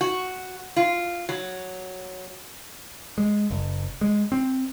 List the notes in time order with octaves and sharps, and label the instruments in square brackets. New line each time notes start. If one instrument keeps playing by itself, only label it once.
[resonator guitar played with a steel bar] F#4
F4
F#3
[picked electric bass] G#3
F#1
G#3
C4